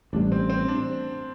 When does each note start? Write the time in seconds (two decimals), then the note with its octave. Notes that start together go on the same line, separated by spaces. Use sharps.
0.13 A1 A2 G3 D4
0.32 C4
0.50 C4
0.68 D4